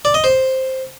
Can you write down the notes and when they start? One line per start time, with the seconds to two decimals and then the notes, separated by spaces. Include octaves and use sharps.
0.05 D5
0.14 D#5
0.24 C5